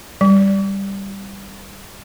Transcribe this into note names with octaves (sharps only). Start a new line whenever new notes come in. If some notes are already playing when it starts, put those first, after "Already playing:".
G3